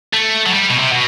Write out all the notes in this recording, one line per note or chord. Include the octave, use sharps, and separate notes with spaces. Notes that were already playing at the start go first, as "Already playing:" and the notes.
A3
F#3
G3
B2
C3
B2